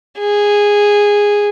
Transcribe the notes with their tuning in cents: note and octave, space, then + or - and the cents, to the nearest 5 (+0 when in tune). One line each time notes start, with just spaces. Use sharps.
G#4 -10